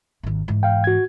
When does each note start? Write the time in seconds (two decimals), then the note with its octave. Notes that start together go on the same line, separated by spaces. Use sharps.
0.23 G#1 D#2
0.48 G#2 E3
0.63 F5 G5
0.84 F#4 G#6